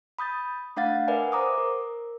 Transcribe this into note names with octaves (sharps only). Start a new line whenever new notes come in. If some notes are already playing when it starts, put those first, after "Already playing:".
B5 D#6 G6 A6
A3 D4 F5 F#5 A6
A#4 B4 D5 E5 F#5 G#5
C5 A#5 D6 D#6
A#4